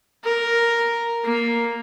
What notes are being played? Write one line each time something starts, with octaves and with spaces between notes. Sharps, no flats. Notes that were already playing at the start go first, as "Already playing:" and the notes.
A#4
A#3